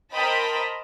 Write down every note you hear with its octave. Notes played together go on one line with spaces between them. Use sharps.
A#4 C5 D#5 G5 A5 B5